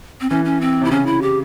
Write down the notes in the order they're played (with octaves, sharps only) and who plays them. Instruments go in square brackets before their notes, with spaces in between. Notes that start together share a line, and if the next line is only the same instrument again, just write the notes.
[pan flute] C4
[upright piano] E3 [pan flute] C#4
[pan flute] C#4
C4
[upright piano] C3 [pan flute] E4
[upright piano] C#3 [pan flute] C#4
[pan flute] E4
G4